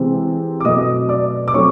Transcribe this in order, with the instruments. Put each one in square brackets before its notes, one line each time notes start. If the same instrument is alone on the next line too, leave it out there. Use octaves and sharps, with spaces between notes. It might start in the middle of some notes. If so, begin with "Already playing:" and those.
Already playing: [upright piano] C3 E3 G#3 C4
D6
B2 F#3 A3 C4 D#5 D#6
D5 D6
D6
F#3 A3 C4 C#5 C#6